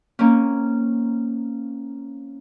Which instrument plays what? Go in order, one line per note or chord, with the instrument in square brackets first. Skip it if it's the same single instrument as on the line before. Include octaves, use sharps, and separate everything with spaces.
[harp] A#3 C4 C#4